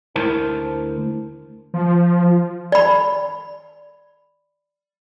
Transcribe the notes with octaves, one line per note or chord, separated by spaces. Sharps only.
D2 E4 A#4 C5 A5
F3
D5 B5